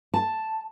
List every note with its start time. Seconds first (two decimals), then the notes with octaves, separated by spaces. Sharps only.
0.14 A5